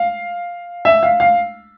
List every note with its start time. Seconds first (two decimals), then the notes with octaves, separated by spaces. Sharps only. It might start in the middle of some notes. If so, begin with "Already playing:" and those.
Already playing: F5
0.85 E5
1.03 F5
1.20 F5